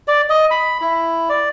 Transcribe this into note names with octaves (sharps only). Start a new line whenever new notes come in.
D5
D#5
B5
E4
D5